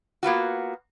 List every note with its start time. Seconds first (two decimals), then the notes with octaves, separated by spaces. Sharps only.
0.23 A#3 B3 F4 F#4